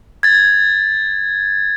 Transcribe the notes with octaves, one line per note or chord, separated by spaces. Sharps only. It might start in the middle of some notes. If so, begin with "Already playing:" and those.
G#6 A6